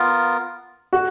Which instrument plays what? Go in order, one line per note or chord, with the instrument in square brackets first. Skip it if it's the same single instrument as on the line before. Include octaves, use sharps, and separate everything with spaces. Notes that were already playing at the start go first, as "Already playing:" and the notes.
Already playing: [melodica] B3 F4 A#4
[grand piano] F#4